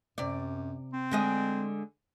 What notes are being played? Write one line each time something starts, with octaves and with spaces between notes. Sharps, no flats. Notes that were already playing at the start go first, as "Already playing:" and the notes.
F#2 C3 D5
C4
D3 G#3 D#5